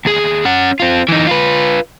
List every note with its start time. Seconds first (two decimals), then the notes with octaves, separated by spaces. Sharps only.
0.05 D#2 G#4
0.45 C#4 F#5
0.80 C4 F4
1.08 E3 D#4
1.27 F4 B4